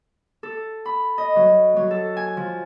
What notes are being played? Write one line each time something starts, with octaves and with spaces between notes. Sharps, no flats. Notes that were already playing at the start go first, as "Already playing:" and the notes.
A4
B5
D#5
F#3
F#3
A4
G#5
F3